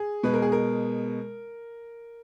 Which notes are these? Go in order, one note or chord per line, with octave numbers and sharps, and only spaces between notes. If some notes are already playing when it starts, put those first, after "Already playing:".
Already playing: G#4
B2 G#3 B4
A#4
G#4
A#4